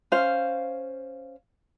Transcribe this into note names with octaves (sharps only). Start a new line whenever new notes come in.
C#4 C5 F5